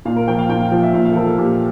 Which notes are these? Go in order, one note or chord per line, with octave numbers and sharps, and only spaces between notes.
A#2 F5
A#4
F3 G5
F5
A#2 G5
F5
F3 G5
E5
A#2 F5
F5
A4
F3 A#4
A4
A#2 G4